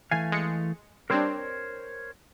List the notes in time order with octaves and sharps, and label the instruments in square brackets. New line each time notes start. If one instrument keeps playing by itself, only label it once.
[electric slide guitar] E3 A3 F5 [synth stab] G#5
[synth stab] G#3 C#7
[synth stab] G3 C4 D4 [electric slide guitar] A#4 C5 C#5